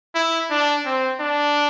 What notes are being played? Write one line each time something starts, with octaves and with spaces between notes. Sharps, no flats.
E4
D4
C4
D4